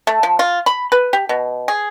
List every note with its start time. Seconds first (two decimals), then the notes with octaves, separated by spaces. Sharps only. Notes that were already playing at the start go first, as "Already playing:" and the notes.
0.07 A3
0.23 F3
0.39 F4
0.66 B5
0.92 B4
1.13 G4
1.29 B2
1.68 G#4